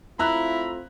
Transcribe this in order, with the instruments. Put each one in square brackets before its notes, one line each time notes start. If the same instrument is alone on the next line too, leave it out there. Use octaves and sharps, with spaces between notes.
[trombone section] A3 C4 F4 [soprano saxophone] E4 [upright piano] A#5 E6 F#6 [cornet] B5